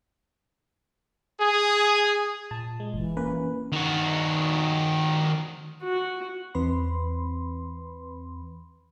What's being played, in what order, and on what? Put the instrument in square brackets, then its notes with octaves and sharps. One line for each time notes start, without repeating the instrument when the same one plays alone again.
[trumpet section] G#4
[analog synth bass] A#2 [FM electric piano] A5
[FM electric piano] G#3
[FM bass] F#1 [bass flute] E3
[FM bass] A#3 [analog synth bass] C#4 [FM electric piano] B4
[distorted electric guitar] D#3 F#4
[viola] F#4
[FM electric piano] E2 E3 C4 B4 B5 C6